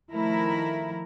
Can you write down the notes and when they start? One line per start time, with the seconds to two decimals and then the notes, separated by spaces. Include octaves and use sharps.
0.12 D#3 F3 A3 E4 A#4